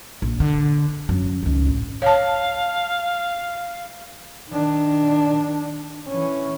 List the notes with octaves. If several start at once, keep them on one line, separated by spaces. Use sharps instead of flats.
A#1
D3
F#2 F#3
C#2 D#3
A1
C#5 F5 A5
D#3 D4
E3 C#4